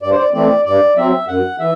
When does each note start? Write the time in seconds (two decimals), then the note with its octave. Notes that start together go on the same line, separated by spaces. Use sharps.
0.02 G2 D5
0.10 C5
0.18 D5
0.33 E3 A3 C4 D5
0.65 G2 D5
0.97 F#3 C4 E5
1.28 F#2 F#5
1.59 E3 E5